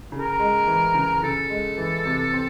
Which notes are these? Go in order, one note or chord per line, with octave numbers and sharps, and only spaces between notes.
C#3
A#4
G#3
E3
C#3
A#4
C#3 A4
G#3
E3
C3
C4